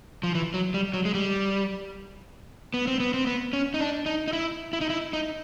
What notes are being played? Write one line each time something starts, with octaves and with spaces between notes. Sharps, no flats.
F3
E3
F#3
G3
F#3
G#3
G3
B3
C4
B3
C4
B3
C#4
D#4
D4
D#4
D#4
E4
E4
D#4
E4
D#4